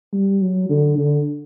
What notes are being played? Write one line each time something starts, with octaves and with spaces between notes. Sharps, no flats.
G3
F#3
D3
D3